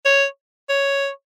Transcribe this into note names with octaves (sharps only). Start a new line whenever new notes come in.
C#5
C#5